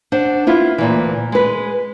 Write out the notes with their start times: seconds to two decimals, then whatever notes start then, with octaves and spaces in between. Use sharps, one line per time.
0.12 D4 C5 F#5
0.47 B3 E4 F4
0.78 D2 A#2 E3
1.32 G#3 B4